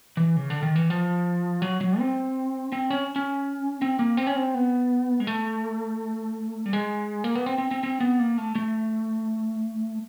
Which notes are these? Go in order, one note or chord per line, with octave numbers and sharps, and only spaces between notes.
E3
C#3
D3
D#3
E3
F3
F#3
F#3
C4
C4
C#4
C#4
C4
A#3
C4
C#4
C4
B3
G#3
A3
G3
G#3
A#3
B3
C4
C4
C4
C4
B3
A#3
A3
A3